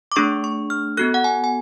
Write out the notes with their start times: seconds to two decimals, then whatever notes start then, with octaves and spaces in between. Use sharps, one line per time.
0.12 D6
0.16 A3 D4 G#4 C#6
0.44 C#6
0.70 F6
0.97 B3 F#4 A4 F#6
1.14 F#5
1.24 G#5
1.44 G#5